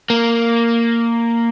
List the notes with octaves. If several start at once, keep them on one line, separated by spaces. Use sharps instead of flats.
A#3